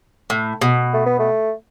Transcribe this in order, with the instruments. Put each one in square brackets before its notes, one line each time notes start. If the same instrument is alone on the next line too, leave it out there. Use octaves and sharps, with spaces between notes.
[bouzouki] A2
B2
[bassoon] A3
B3
A3